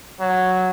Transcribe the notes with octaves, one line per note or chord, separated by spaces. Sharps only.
F#3